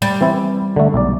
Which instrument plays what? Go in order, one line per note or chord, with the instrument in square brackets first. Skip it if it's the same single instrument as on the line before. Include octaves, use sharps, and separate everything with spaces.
[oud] G3
[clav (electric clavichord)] E3 C4 E4
D3 A3
B1 D5